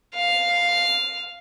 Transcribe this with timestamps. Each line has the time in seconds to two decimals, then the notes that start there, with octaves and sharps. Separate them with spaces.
0.15 F5